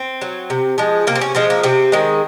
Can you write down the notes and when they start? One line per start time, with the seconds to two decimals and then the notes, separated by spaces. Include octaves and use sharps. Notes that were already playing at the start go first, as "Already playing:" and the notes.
Already playing: C4
0.21 F#3
0.50 C3
0.78 F3 G#3
1.07 C3 A#3
1.15 C4
1.21 C#4
1.35 F3 G#3 C4
1.50 A#3
1.63 C3 C4
1.92 D#3 G#3